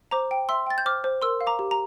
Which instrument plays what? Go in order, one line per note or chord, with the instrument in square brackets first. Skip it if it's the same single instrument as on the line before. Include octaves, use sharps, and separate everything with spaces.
[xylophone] C5 A#5 D6
G5
E5 C6 E6
G5 A6
G6
C5 D6 F6
C5
A#4 C6 E6
F5
A#5 D6
G4
A#5